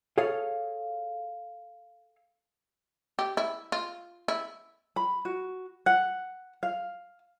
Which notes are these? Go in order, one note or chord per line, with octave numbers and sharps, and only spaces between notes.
G#4 A4 C#5 F5
G4
E4
F4
E4
B5
F#4
F#5
F5